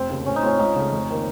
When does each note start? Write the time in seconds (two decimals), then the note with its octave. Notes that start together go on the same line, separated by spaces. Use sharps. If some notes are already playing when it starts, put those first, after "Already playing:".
Already playing: F1 C4
0.09 D#2 C#3
0.26 A2 C#4
0.36 D#4
0.43 A3 C4 C#4 F4
0.59 C#2 D#4
0.76 C#3 A3
0.92 F1
1.10 D#3 A#3